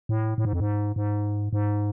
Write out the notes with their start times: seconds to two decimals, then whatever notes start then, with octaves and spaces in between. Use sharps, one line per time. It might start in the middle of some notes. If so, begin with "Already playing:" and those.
0.09 A2
0.38 A2
0.45 G#2
0.53 F2
0.60 G#2
0.96 G#2
1.53 G#2